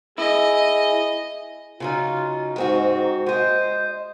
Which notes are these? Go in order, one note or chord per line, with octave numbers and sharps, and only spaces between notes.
E4 G#4 D#5
C#3 F#3 D#4 F4
G#2 G#3 C4 F#4
G#3 C5 D#5